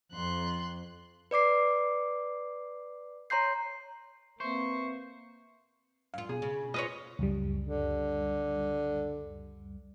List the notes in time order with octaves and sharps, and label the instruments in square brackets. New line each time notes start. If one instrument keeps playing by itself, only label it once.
[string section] F2 [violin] C6 F#6
[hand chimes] B4 D5 D6 C7
C#5 A#5 C6 G6 C7
[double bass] A#3 [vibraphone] C4 B4 E5 [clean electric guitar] C5 [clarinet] C#6
[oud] F#2 F4 [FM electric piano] F5
[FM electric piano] B2 [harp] G#4
[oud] C#3
[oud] F4 B4 C#5 [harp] D#5
[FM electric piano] C#2 F#2 G3
[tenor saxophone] D3